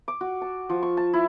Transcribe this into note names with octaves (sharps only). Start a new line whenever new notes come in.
D6
F#4
A5
F3
C#6
A5
E4